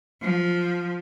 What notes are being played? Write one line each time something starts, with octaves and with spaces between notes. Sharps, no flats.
F3